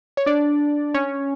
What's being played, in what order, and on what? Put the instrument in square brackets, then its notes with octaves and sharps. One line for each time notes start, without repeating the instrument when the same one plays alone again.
[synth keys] C#5
D4 D5
C#4 C#5